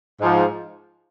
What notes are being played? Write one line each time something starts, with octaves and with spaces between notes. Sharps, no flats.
G#2 F3